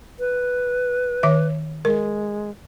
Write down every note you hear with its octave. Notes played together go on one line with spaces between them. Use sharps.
B4
D#3 C#5 E5
G#3 A#4